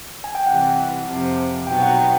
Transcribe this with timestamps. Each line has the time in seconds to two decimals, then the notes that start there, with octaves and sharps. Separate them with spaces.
0.24 G#5
0.35 G5
0.46 C3 E3 G3 F#5
1.07 F2 C3 F3
1.67 B2 F#3 B3 D#4 G5
1.82 F#5
1.97 G5